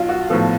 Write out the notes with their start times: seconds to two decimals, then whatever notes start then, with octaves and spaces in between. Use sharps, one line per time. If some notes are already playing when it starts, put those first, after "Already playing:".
Already playing: B1 F4
0.09 F#4
0.30 A2 F3 B3 A4